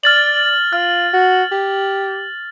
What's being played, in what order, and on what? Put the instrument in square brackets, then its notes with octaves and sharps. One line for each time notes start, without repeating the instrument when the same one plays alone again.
[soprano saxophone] D5 [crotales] F6 A6 F#7
[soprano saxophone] F4 [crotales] F6
[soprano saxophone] F#4
G4